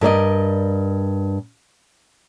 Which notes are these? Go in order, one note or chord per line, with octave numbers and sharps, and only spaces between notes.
G2 A#4 D5 D#5